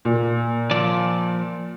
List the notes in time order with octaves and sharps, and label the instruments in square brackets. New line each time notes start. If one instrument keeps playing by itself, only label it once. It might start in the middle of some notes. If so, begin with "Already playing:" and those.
[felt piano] A#2
[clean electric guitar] F3 D5